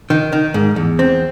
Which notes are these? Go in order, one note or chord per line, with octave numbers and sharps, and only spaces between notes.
D#3
D#3
G#2
E2
C4